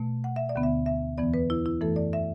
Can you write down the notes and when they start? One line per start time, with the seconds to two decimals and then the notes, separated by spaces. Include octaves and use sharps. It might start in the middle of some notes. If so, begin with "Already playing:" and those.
Already playing: B2 A3
0.24 F#5
0.36 E5
0.49 D5
0.55 D2 D3 B3
0.63 E5
0.86 E5
1.18 E2 E3 B3 D5
1.34 B4
1.50 E4
1.66 E4
1.81 F#2 E3 A3 A4
1.96 D5
2.13 E5